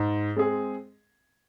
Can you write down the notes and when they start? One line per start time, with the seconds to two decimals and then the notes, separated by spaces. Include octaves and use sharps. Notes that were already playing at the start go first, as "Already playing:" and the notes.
Already playing: G#2
0.36 G#3 C4 G#4